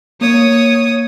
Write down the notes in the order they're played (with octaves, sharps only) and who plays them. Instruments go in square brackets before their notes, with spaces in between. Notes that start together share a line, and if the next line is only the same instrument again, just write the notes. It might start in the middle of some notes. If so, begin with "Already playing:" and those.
[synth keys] A#3 [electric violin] C#5 [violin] D#6